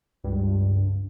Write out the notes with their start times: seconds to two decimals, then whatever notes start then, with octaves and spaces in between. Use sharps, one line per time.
0.24 C#2 G2